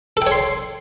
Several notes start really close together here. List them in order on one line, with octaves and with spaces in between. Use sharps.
A4 G5 C#5 C6